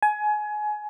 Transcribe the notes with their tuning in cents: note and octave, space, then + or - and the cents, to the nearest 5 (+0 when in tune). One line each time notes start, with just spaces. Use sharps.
G#5 +25